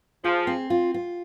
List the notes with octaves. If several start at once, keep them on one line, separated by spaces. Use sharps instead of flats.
F3 G#4
C4
F4
F4